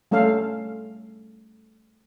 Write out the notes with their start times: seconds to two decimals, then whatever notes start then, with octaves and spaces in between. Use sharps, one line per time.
0.11 G3 A3 C#4 A4 F5